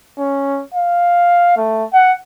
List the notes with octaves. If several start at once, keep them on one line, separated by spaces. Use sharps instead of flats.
C#4
F5
A3
F#5